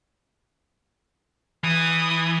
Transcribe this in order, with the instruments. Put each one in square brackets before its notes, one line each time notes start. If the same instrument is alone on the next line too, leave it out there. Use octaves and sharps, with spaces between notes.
[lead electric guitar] E3 [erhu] D#6